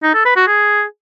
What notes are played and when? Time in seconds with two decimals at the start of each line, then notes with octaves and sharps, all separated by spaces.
0.03 D#4
0.14 A4
0.25 B4
0.36 F#4
0.47 G#4